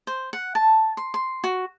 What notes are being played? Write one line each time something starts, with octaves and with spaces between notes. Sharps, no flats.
C5
F#5
A5
C6
C6
F#4